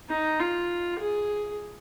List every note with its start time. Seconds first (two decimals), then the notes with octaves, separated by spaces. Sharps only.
0.10 D#4
0.40 F4
0.99 G#4